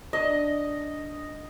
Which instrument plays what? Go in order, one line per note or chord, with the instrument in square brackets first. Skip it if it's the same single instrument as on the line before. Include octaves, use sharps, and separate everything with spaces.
[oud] D4 [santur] D#5